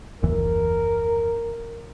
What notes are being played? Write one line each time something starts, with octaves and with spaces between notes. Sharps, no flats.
F#1 D#2 E3 A#4